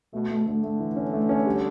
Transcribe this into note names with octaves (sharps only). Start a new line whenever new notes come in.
B2 A3
A3
D3 A3
A3
E3
C#4
A3
C#4
G3